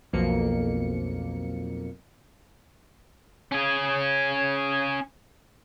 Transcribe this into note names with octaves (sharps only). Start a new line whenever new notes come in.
B1 F2 A#3 C#7
C#4 G#4